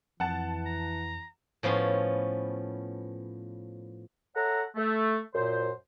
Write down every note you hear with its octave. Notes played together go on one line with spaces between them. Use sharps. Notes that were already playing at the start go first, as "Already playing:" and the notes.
F2 E3 F#5 A5
A#5
A2 F3 B3 C#4 C6
A4 C#5 E5 F#5 A#5
A3
F#2 A#2 C5